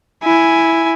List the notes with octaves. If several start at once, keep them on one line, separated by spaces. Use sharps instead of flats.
E4 G#5